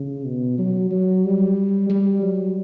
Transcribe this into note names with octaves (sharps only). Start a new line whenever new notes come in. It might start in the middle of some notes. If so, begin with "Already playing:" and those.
Already playing: C#3
B2
F#3
F#3
G3
G3
F#3